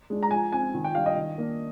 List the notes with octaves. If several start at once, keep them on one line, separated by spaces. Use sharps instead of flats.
G#3 D4
A#5
F3 G#5
C4 G#5
D#3
G5
G3 D4 F5
D#5
D#3
A#3 D4